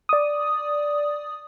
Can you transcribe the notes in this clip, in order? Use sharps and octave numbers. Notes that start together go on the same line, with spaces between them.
D5 D#6